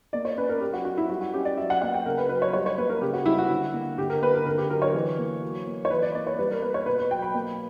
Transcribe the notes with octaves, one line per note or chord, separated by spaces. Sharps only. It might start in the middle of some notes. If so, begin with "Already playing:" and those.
A#3 D5
C#5
C#4 B4
A#4
F#3 G4
F#4
C#4 F#4
E4
G3 F#4
F#4
C#4 G4
D5
F#3 E5
F#5
A#3 F#5
G5
C#3 A#4
B4
F#3 B4
C#5
G3 C#5
C#5
A#3 B4
A#4
C#3 G4
F#4
G3 E4
F#4
D3
A#3
D3 G4
A#4
A#3 B4
A#4
D3 A#4
G4
F#3 A#4
C#5
E3
A#3
F#3
A#3
C#5
E3 B4
D5
A#3 D5
C#5
G3 B4
A#4
A#3 B4
C#5
B2 B4
B4
F#3 G5
B5
A#3